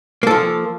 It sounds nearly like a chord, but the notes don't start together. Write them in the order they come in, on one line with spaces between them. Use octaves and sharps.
A#3 A4 F3